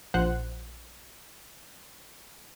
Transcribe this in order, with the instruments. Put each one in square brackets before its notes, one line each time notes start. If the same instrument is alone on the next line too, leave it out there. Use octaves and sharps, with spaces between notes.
[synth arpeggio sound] A#1 F3 C5 F#5 F#6